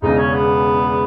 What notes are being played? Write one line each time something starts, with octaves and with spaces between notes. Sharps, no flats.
E1 E2 C#3 D#4
C#4
B3